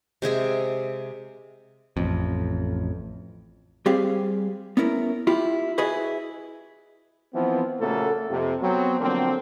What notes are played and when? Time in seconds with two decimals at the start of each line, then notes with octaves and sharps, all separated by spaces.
0.22 C3 G#3 G#4 E5
1.97 A1 F2
3.86 G3 C4 G4 G#4 F5
4.77 B3 C#4 E4 A#4
5.27 E4 F4 G4
5.78 E4 F#4 G#4 B4 D#5
7.35 E3 F3 B3 C4
7.80 A#2 C#3 A3 A#3 F#4 A4
8.30 F2 C3
8.62 F#3 B3 C4
9.00 D3 F3 F#3 A#3 C4